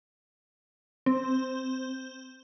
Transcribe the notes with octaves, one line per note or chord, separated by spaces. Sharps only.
C4